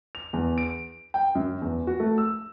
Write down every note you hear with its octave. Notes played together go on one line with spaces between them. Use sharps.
F7
E2
D7
G5
F#2
E2
F#4
A3
E6